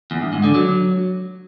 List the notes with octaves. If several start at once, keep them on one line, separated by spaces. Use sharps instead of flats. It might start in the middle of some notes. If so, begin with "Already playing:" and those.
E2
G2
G#2
D3
F#3